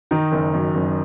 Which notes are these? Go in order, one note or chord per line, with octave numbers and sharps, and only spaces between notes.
D#3 D#4
F#1
F#2
F#1